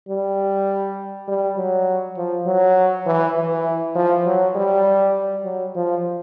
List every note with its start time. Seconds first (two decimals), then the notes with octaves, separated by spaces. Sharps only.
0.08 G3
1.28 G3
1.57 F#3
2.17 F3
2.46 F#3
3.06 E3
3.36 E3
3.95 F3
4.26 F#3
4.56 G3
5.44 F#3
5.75 F3